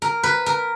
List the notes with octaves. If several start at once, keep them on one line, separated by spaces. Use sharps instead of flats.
A#4
B4
A#4